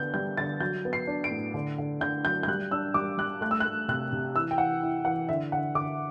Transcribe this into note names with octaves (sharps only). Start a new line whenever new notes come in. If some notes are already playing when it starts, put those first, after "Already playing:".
Already playing: D3 B3 G6
G3 G6
D3 A6
F#3 G6
B3
C7
D4
D7
A2
D3
D3
D3 G6
F#3 G6
G6
G3 F#6
D4 E6
G3 D6
G3 F#6
A3 F#6
E6
F#6
A3
C3 F#6
C3
E3 E6
G5
E3 F#5
E4
E3 F#5
D3 E5
D3 F#5
D3 D6